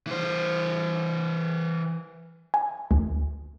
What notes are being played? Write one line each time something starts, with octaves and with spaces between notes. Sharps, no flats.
E3 C5
G#5
D2